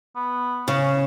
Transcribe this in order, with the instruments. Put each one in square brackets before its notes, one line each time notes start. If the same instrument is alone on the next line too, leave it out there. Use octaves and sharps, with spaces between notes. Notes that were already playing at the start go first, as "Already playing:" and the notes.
[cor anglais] B3
[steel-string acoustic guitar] C#3 [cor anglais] C#4